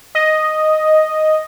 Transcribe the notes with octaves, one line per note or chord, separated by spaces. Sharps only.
D#5